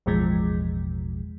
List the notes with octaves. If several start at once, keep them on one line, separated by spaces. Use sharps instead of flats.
A1 E2 B2 F3 G#3